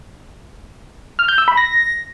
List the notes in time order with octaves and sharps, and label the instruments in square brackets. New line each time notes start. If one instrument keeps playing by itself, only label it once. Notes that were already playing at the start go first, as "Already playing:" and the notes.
[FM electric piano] F6
G6
E6
B5
A#6